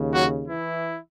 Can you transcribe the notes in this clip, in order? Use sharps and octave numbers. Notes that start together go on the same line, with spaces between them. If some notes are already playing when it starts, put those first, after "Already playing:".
Already playing: D#2 C#3
F#3 F#4
E3 E4